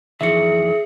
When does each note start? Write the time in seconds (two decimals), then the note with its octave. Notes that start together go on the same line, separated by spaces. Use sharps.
0.21 F2 D#3 E3 G#4 E5 C#7